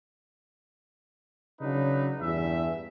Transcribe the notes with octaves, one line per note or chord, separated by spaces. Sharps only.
C#3 F#3 D4 D#4 B4
E2 G2 G#4 E5